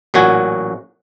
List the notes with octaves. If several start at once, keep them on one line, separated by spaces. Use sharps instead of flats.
A1 A#2 F#3 F#4 G#5